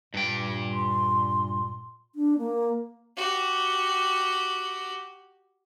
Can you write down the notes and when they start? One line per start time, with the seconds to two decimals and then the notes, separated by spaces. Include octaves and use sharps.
0.14 G2 A#2 G5
0.72 C6
2.15 D4
2.38 A#3
3.17 F#4 G4